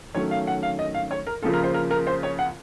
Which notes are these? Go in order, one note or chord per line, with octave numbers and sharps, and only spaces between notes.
D#3 F#3 A3 C#4 C#5
F5
F#5
F5
D#5
F5
C#5
A#4
C#3 F3 A#3 F4 A4
A#4
C5
A#4
A#4
C5
C#5
F#5